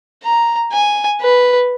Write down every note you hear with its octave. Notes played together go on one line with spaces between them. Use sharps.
A#5
G#5
B4